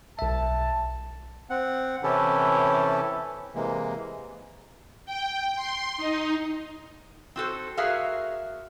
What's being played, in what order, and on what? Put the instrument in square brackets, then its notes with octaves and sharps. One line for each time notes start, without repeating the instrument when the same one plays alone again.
[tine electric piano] B1 E5 [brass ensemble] A5
[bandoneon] C4 F#5
C3 E3 C#4 E4 G4 A4
C3 E3 G#3 A#3
[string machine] G5
C6
D#4
[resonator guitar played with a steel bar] C4 F#4 A4 C5
F#4 G#4 A#4 E5 F5